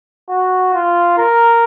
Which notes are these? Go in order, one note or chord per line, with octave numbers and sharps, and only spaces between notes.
F#4
F4
A#4